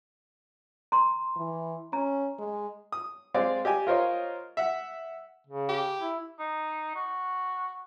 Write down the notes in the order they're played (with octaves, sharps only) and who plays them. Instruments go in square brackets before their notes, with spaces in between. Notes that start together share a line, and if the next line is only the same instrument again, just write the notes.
[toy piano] A#5 C6
[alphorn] E3
[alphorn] C#4 [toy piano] A#5
[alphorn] G#3
[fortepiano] D#6
G#3 C4 G#4 D5 F5
G4 D5 D#5 G5 G#5
F4 A#4 C5 C#5 D#5
E5 F#5
[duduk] C#3
[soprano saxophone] G4
[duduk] E4
[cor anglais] D#4
F#4